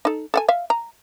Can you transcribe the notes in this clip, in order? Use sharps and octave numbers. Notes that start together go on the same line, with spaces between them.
D#4 A4
A4 F#5 G#5
E5 F5
A#5